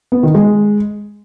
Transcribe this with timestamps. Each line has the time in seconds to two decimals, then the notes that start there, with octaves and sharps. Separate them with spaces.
0.12 B3
0.23 D#3
0.34 G#3